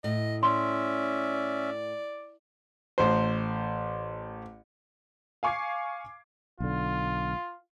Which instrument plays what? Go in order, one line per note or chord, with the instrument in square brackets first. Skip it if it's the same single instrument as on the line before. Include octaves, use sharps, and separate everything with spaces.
[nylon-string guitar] A2 [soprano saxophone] D#5
[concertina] C#4 E5 [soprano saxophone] D5 [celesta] C6
[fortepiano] A1 C5
[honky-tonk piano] F5 G#5 C#6 D6 G#6 C7
[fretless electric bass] B1 D3 [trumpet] F4